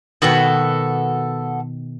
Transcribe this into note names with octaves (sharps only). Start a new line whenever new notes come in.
B2 D#3 B3 F#4 A4